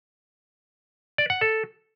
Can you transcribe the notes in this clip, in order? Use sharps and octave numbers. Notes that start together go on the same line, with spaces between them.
D5
F#5
A4